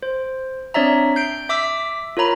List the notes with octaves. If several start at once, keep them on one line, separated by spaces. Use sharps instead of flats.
C5
C4 D4 C#5 D5 E5 A#5
G6 C7 D7
E5 D6 E6 B6
F4 A#4 C#5 A#5 B5